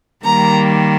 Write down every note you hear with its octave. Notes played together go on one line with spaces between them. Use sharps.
D#3 G3 A#3 A#5